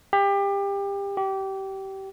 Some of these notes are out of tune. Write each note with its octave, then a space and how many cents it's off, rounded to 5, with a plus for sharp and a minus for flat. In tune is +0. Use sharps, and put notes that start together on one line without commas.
G4 +25
G4 -25